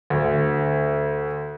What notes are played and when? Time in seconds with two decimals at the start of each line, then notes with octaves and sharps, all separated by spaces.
0.10 D2